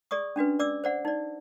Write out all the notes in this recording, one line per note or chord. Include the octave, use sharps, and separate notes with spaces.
G#4 D5 C#6 D#6
C#4 D4 F#4 B4
D5 D6 E6
C5 D5 F#5
D#4 D5